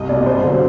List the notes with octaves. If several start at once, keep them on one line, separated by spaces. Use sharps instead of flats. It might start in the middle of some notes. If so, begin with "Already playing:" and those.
Already playing: C2 D#5
B2 G3 D5
G2 C5
D3 F#3